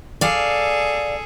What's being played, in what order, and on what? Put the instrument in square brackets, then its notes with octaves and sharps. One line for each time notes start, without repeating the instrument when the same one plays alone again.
[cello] G#4 A4 [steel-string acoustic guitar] D5 F5